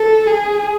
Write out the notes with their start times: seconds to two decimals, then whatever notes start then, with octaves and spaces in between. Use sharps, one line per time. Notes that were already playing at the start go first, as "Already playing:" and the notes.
Already playing: A4
0.27 G#4